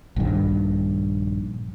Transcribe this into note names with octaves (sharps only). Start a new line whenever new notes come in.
A#1 G2 D#3